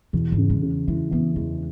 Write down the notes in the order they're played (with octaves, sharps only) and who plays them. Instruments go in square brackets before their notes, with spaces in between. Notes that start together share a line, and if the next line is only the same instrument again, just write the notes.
[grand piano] E2 [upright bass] B2
[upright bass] G#2
[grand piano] C#3
[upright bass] G#3
[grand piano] C#3
[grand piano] E3 [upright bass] G#3
[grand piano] E3 [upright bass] B3
[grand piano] E2 [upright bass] G#3